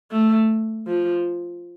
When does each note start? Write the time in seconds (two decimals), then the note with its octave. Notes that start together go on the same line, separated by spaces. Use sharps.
0.12 A3
0.87 F3